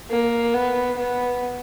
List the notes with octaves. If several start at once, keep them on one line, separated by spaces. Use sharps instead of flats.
A#3
B3
B3